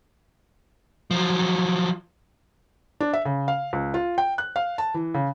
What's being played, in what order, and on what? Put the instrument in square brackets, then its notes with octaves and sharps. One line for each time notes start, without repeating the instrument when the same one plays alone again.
[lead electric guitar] F3 F#3
[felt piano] D4
E5
C#3
F5
C#2
F4
G5
F#6
F5
A5
E3
C#3